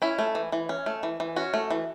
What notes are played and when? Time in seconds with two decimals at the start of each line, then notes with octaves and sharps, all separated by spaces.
0.02 C#4 E4
0.19 A3
0.35 E3
0.52 E3
0.69 C#4
0.86 A3
1.03 E3
1.20 E3
1.36 C#4 F#4
1.54 A3
1.71 E3